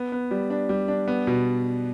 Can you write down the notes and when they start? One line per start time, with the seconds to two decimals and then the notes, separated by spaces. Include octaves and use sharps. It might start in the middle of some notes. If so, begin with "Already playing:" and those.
Already playing: B3
0.12 B3
0.31 G3
0.50 D4
0.69 G3
0.88 D4
1.08 B3
1.27 B2